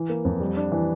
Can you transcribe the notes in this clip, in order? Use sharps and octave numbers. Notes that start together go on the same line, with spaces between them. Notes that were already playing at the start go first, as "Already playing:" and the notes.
Already playing: E3
A#3
F2
G3
D4
E3